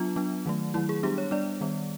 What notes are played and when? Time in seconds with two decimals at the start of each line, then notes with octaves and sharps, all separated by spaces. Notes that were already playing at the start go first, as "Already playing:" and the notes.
Already playing: F#3 B3 D4 F4
0.16 F#3 B3 D4
0.46 D#3 F#3 A3
0.74 D#3 F#3 A3 E4
0.89 G#4
1.03 G3 B3 D4 G4
1.18 C#5
1.31 G3 B3 D4 D5
1.61 D#3 G3 B3